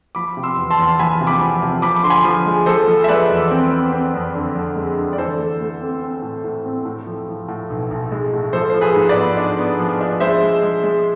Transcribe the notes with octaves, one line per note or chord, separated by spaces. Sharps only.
F3 B5 D6
C3
C6 E6
E2
A5 C6
E2
F3 G#5 B5
C3
B5 D6
F3
C3
F3 B5 D6
D6
D3 C6
G#5 B5
F3
G#3
F3 A4 C5
F3
E5
G#3 B4 D5
E2
C4
C4
C4
F2
D3
F2
G#3
D3
D5
E3 A4 C5
A3
A3
C4
C4
A2
A2
C4
A2
F3
F3
A2
B1
B1
G#3
A2
F3 A4 C5
F3 C5
G#4 B4
G#2
B4 D5
B3
D4
B3
F3
D4
G#3 C5 E5
G#3
G#3
G#3